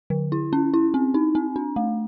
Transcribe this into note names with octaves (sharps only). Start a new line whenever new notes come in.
D3
E4
C#4
E4
C4
D#4
C4
D4
A3